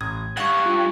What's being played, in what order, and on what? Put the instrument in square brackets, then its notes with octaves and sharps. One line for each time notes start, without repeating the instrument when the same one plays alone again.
[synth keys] A1 [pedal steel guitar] D#6 [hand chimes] G#6
[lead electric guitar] G2 [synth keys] F#5 [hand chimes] C#6 G#6
[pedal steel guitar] F4